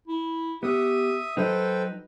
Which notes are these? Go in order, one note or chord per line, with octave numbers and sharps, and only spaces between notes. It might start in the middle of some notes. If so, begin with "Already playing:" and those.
E4
B3 G4 E5 D#6
F#3 D#4 A4 B4 C5 G5